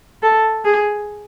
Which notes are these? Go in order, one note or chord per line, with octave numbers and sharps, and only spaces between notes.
A4
G#4